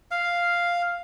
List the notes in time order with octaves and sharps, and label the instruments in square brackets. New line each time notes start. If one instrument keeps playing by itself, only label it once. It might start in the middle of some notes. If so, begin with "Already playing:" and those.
[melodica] F5